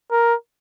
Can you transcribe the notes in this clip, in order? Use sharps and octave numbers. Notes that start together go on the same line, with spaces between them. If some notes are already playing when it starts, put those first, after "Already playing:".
A#4